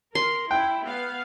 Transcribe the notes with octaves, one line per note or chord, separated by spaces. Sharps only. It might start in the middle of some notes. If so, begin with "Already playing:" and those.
A#4 C6
E4 G5
B3 F5